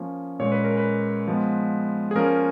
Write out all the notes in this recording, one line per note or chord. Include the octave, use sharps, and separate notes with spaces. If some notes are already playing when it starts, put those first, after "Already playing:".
Already playing: F3 A#3 C#4
A#2 G#3 C#4 C#5
B4
A#4
B4
F3 G#3 B3
G#4
F3 A#3 C#4 A#4